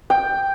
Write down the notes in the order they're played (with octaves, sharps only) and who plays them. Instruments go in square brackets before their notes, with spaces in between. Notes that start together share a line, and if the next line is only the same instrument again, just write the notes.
[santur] G5